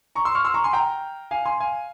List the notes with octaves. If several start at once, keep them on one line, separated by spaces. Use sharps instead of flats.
A#5 C#6
C6 E6
C#6 F6
C6 E6
A#5 C#6
G#5 C6
G5 A#5
F5 G#5
G#5 C6
F5 G#5